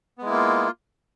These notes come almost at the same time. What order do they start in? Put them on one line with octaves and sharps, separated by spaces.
B3 G#3 E4 A#3 F4